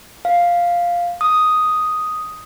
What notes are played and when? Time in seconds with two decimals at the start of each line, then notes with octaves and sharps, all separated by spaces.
0.25 F5
1.21 D#6